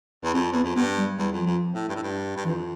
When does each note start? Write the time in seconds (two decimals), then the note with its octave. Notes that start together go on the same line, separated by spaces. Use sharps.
0.24 E2
0.33 F2 C4
0.52 E2 B3
0.64 F2
0.76 G2 B3
0.97 G3
1.18 E2 G3
1.32 F2
1.40 F3
1.46 F2
1.74 A2
1.89 G2
1.96 A2
2.03 G2
2.37 G2
2.45 F2 E3